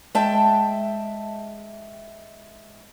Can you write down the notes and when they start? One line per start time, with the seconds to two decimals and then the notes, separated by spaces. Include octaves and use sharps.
0.15 G#3 E5 G5 A5